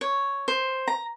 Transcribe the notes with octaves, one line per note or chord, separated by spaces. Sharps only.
C#5
C5
A#5